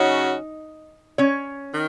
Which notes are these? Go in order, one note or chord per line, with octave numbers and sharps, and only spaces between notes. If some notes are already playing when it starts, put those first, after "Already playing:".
Already playing: C#3 F#3 C#4 D#4 F#4 D#5
C#4 C#5
D#3